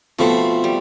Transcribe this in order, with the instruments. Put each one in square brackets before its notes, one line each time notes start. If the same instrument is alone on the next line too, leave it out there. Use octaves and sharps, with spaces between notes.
[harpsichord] B2 A3 C4 [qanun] F3
[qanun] G3